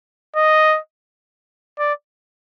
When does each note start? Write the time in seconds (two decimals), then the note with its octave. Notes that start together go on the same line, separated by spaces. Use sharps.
0.36 D#5
1.79 D5